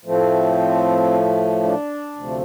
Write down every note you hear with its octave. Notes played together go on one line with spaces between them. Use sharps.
A2 F3 A3 C4
D4
D2 C3 F3 A3